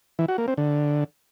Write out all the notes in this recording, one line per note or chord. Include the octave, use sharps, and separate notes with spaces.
E3
F#4
A#3
C4
D3